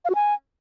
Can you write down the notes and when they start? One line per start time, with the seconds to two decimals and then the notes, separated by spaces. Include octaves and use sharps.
0.05 F5
0.10 F#4
0.15 G#5